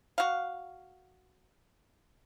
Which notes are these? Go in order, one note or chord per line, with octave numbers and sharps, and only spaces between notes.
F#4 F5